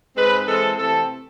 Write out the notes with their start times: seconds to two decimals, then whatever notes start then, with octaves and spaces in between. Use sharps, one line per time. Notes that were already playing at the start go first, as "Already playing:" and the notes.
0.16 G#2 G#3 C4 B4
0.46 E3 G#3 C4 A4
0.77 C3 E3 A3 C4 A4